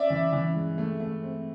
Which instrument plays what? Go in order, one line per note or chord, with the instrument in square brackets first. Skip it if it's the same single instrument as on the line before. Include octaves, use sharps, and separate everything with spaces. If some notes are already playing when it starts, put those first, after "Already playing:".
Already playing: [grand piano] C#4 [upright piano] D5 E5
[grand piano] E3
E3
G#3
A3
A3
C4